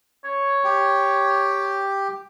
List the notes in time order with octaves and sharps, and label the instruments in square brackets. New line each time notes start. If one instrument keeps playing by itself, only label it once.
[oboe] C#5
[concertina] G4 G5